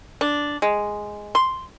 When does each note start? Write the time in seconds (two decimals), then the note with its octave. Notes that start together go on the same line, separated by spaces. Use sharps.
0.21 D4
0.62 G#3
1.35 C6